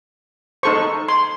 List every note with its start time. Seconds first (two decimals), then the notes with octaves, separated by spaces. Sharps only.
0.63 D#4 A4 C5 C#6
1.08 C6